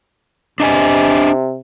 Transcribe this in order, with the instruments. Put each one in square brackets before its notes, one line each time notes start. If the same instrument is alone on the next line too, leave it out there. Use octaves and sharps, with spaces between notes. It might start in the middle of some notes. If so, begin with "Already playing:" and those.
[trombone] C3 [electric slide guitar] D4 D#5 G#5